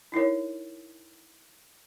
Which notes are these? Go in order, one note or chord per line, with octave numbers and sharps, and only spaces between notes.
D#4 E4 A#4 C#5